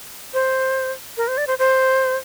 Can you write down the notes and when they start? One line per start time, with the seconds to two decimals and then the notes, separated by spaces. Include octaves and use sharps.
0.34 C5
1.17 A#4
1.28 C5
1.38 D5
1.47 C5
1.59 C5